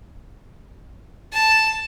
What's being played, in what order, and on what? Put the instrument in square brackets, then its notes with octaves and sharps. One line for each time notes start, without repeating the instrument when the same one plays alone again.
[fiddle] A5